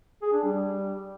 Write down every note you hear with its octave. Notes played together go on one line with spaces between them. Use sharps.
G#4
D4
G3